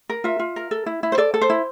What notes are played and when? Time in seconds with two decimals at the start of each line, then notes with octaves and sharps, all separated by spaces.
0.09 A#4
0.24 F4 E5
0.39 F4
0.56 A#4
0.71 A4
0.86 E4
1.03 E4
1.12 C5
1.18 A4 D5
1.34 A4
1.41 C5
1.50 E4